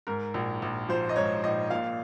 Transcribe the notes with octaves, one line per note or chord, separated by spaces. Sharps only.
G#2 A#4
A#1
A#1
F3 C5
D#5
G#2 C#5
A#1 D#5
A#2 F5